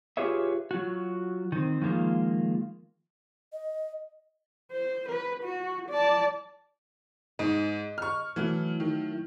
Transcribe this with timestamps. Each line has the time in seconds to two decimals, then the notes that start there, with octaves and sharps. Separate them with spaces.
0.17 F4 G4 G#4 B4 C#5 E5
0.71 F#3 F4 F#4
1.52 D#3 C4
1.81 D#3 F3 G#3 A#3 F4
3.53 D#5
4.71 C5
5.09 B4
5.44 F#4
5.90 D5 A5
7.39 G#2 D#5
7.98 C#6 F6
8.36 E3 F#3 A3 E4
8.80 D#3